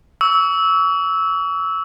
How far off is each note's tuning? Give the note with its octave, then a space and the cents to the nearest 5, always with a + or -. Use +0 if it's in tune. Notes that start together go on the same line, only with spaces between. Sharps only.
C#6 +40 E6 -15